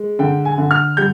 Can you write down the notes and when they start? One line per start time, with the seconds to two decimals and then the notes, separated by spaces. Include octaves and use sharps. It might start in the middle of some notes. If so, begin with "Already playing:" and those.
Already playing: G#3
0.19 D3 G5
0.45 G#5
0.58 D3
0.71 F6
0.97 G3 G6